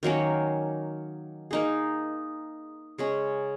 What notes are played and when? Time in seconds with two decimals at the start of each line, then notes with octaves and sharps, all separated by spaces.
0.03 D#3 F#3 A#3 C#4
1.51 A#3 D#4 G#4
2.98 C#3 G#3 C#4